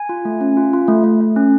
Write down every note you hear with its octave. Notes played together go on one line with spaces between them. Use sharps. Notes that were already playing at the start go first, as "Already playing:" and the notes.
Already playing: G#5
F4
A3
C#4
F4
F4
A3
A3
A3
C#4